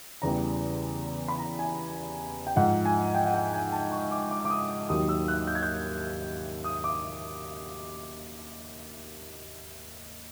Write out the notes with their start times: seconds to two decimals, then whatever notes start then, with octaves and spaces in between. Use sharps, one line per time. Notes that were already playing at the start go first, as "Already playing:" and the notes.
0.22 E2 C#3 E3 G3 A#5
1.28 B5
1.39 A#5
1.59 G#5
2.47 G5
2.56 G#2 F3 F#5
2.85 G#5
3.15 G5
3.25 F#5
3.34 G5
3.53 G#5
3.72 A5
3.92 C#6
4.11 D6
4.31 D6
4.45 D6
4.50 D#6
4.89 D#2 D#3 F#3 D#6
5.09 E6
5.28 F#6
5.47 G6
5.55 G#6
5.62 G6
6.64 D#6
6.84 D6